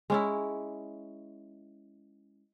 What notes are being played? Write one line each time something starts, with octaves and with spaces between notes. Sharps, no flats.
G#3 C#4 E4